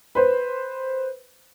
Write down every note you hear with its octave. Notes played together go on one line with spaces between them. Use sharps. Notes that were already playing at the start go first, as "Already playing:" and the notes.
B4 C5